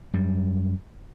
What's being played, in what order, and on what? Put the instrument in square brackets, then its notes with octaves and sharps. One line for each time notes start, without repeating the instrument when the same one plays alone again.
[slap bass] F#2 G3